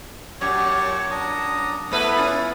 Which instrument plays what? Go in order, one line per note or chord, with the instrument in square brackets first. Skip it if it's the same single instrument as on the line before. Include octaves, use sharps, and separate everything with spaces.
[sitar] F#2 A#2 [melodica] G4 C#5 C#6
[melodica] D4 A#5 D#6
[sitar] A3 B4 [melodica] B3 E4
[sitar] C#4 F4